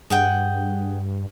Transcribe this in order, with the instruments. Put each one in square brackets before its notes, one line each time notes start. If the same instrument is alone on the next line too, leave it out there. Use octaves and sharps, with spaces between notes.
[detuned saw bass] G2 [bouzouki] G#4 F#5 G5